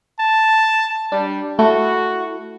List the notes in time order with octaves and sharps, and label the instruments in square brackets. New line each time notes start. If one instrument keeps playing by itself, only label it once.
[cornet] A5
[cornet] G3 [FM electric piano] D4
[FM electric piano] A3 E4 [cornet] F#4